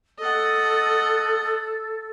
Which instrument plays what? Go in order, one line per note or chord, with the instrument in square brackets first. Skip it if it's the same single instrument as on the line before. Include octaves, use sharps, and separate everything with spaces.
[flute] A4 [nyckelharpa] D#5 F#5